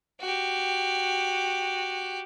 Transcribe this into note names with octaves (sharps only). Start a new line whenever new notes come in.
F#4 G4